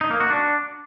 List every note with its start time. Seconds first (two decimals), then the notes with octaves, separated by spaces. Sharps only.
0.01 D#4
0.11 A#3
0.20 F#4
0.30 D4